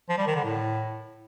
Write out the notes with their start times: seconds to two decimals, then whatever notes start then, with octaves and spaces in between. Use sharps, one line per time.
0.09 F3
0.18 G3
0.27 D#3
0.36 D3
0.44 A2